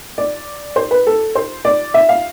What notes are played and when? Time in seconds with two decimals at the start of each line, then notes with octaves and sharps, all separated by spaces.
0.18 D5
0.76 C5
0.91 B4
1.07 A4
1.35 C5
1.65 D5
1.94 E5
2.09 F5